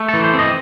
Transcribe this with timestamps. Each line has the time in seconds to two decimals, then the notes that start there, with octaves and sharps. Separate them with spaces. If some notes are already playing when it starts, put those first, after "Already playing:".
Already playing: A3
0.08 A4
0.14 E3
0.24 C5
0.34 C4
0.39 D#5